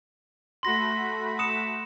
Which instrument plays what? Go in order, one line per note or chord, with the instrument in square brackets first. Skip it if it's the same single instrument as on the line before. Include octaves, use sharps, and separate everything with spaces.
[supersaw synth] A3 F#4 B5 [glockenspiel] C6 A#6
[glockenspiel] D#6 C#7 E7